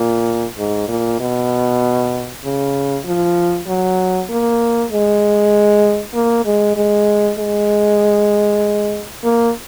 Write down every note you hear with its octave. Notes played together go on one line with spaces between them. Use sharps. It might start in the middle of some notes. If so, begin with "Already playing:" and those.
Already playing: A#2
G#2
A#2
B2
C#3
F3
F#3
A#3
G#3
A#3
G#3
G#3
G#3
A#3